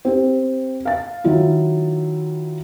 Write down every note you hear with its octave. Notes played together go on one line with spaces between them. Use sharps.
C4 G4
F5 A6
D#3 F#3 E4 F4